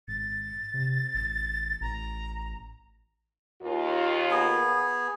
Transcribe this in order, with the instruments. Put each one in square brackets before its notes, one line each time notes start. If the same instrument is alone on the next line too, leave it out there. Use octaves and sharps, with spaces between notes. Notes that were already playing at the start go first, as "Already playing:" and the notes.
[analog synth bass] G#1 [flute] A6
[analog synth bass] C3
A1
[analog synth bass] A1 [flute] A#5
[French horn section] D#2 F4
[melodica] B3 G#4